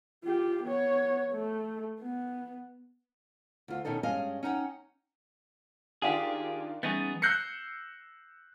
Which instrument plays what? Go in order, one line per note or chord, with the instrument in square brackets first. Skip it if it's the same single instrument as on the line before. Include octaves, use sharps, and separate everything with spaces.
[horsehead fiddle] F4 G4
B3 C#5
A3
B3
[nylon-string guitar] D2 F4
B2 D#3 C#4 D#4 A4
G2 G#3 C#4 D#5 F5 G#5
C#4 D#4 F#5 G5
[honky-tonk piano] D#3 D4 F4 [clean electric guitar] G4 G#4
[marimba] E3 G3 C#4 [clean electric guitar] B3 D#4 G#4 [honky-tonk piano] A6
[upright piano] E6 F#6 G6 A#6 C7 C#7